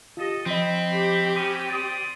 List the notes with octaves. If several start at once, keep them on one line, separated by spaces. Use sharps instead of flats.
F4 G4 A4 D#5
F3 C4 D#5 B5
G4
C#4 B5 D#6
D5 C6 D#6 A6